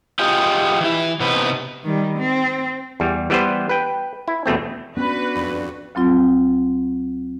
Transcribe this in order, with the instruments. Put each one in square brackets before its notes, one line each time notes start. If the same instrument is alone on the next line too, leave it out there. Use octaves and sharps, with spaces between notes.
[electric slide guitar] F4 G4 G#4 D#5
E3 E4
C3 B3 D#4 B4
[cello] D#3 G3
C4
[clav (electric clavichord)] E2 G3
E3 G3 B3 B4 C5
B4 G5
E4
E2 B2 A3 C4
[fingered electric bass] B3 C#4 [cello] D4 F#4 [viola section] B4
[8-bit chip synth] F2
[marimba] D2 F#3 C4 F4